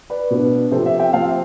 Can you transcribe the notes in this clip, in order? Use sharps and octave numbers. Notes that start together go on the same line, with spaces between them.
B4 D5
B2 B3 D4
C3 F3 C4 A4 C5
C5 E5
E5 G5
C3 F3 C4 F5 A5